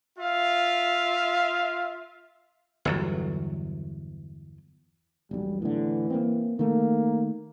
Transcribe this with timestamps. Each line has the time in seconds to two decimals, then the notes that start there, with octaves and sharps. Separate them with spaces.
0.19 F4 E5 F5
2.85 G1 E2 F#3
5.31 E1 B1 G3
5.62 A2 D3 E3
6.10 A#3 C4
6.59 D#3 A3 A#3